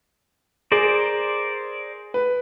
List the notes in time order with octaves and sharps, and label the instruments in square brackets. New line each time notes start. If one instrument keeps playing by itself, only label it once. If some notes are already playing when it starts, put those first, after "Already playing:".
[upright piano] G#4 [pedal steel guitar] A#4 C5 D5
[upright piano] B4